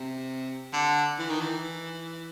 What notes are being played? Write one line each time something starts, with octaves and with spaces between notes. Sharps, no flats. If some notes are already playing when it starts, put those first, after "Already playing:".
Already playing: C3
D3
E3
D#3
E3